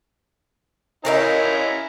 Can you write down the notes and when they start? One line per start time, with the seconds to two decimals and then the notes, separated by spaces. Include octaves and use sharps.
1.05 C#4 D#4 E4 A#4 F5 A#5